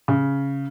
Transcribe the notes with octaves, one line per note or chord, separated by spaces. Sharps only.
C#3